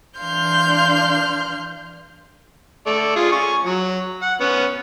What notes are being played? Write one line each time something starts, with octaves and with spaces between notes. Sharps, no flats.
E3 D4 F5 C6 F6 G6
A3 D5
F4 G#4
G#5 C#6
F#3
F#5
B3 C#4